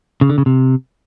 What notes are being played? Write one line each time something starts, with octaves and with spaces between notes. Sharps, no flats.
C#3
D3
C#3
C3